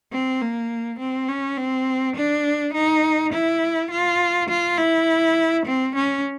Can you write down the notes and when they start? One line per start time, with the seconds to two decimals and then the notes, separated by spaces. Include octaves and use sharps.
0.12 C4
0.41 A#3
0.99 C4
1.28 C#4
1.57 C4
2.16 D4
2.74 D#4
3.33 E4
3.90 F4
4.49 F4
4.78 E4
5.66 C4
5.95 C#4